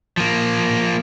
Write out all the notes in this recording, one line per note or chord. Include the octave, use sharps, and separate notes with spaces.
F3 A#3